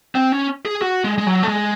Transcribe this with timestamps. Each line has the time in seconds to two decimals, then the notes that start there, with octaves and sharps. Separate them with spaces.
0.15 C4
0.32 C#4
0.65 G#4
0.82 F#4
1.04 G#3
1.18 G#3
1.27 F#3
1.43 A3
1.48 G#3